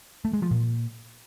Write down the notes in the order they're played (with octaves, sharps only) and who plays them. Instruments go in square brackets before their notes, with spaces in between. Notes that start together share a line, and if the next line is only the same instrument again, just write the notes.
[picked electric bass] A3
G#3
F3
A#2